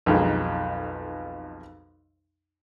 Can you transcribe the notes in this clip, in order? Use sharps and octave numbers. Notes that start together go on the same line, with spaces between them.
B1 F2 D#3 G#3